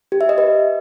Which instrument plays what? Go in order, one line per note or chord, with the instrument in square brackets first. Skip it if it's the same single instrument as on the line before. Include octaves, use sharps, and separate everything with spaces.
[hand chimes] G4
E5
D#5
B4